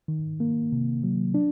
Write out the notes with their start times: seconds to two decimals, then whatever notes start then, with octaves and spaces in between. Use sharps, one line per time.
0.08 D#3
0.40 A#3
0.72 C3
1.03 F#3
1.34 D4